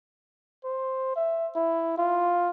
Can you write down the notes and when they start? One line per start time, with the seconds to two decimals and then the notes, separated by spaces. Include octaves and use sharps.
0.64 C5
1.16 E5
1.55 E4
1.97 F4